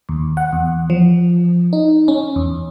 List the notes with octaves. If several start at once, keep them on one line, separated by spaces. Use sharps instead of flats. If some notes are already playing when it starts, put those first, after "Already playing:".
D#2
F#5
E2
F3
D#4
C#4
E2